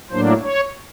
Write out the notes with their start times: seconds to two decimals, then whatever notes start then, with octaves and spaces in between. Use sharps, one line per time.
0.11 A2 F#3 A#3 D4 C5
0.42 C#5